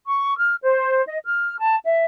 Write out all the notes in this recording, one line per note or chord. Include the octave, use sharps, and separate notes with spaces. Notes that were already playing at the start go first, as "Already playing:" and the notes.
C#6
F6
C5
D#5
F6
A5
E5